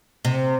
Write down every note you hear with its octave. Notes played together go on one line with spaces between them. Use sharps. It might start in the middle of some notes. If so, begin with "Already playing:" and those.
C3